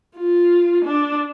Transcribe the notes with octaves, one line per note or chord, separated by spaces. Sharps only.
F4
D4